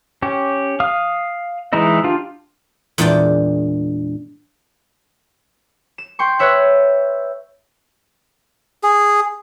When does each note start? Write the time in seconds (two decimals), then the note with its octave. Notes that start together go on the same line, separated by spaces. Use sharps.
0.22 C#4 G4
0.80 F5 D#6 F6
1.73 E3 G#3 D#4 E4 D#5
2.04 D4 F4 G4
2.98 E2 A#2 G#3 D4 D5 G5
5.98 E7
6.19 G5 C6 C#6
6.39 B4 C#5 E5 F#6
8.83 G#4